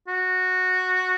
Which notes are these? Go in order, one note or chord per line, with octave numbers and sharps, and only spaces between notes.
F#4